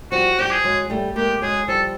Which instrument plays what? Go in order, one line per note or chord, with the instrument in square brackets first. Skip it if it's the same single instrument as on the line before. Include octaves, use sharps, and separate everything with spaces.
[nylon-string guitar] F3 G3 [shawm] F#4
[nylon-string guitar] F3 G3 [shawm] G4
[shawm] G#4
[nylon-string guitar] F#3 G#3
G3 A3
[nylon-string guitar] G#3 A#3 [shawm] G4
[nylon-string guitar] F#3 G#3 [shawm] G#4
[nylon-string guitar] F3 G3 [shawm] A4